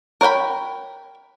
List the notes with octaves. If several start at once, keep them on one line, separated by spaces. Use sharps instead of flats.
A#4 C#5 F#5 G5 B5